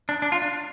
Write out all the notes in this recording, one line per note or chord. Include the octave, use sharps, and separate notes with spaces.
D4
D4
F4
D4